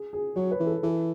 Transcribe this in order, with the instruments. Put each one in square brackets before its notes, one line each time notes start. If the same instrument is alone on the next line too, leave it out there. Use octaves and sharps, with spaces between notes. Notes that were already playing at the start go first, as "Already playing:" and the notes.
Already playing: [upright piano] G#4
G#4
[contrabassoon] F#3 [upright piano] C#5
[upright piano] B4
[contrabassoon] E3
[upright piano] A4
[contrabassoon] E3 [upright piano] A4